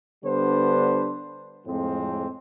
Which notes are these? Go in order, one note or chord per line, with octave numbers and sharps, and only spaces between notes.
D3 G3 B3 D4 B4 C5
F2 A2 F3 G#3 C4